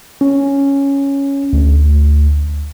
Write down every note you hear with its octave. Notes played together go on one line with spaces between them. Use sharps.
C#4
D2